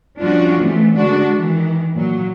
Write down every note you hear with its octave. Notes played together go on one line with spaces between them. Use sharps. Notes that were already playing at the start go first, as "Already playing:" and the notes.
F3 G3 C#4 D4 F4 F#4
E3 G3 A3 B3 C4
D3 G#3 D4 F#4
D#3 E3
A#2 F#3